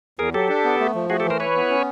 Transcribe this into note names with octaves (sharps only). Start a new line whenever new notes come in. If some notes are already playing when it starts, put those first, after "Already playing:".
E2 G#4 A#4
F#3 G4 A4
D4
B3
A3
F3
A3 F#4 G#4
G4 A4
E3
A#4 C5
E4 B4 C#5
B3
C#4